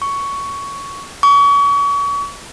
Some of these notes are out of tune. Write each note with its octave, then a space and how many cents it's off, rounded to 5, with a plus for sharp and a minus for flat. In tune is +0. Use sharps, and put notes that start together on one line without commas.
C#6 +10
C#6 +35